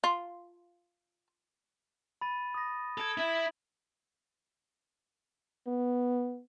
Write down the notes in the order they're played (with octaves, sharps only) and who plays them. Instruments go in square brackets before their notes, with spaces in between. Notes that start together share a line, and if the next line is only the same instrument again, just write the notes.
[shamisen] F4
[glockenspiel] B5 A6 D#7
D#6 A#6
[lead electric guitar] A4 [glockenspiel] G#6 D7 F7
[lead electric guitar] E4
[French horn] B3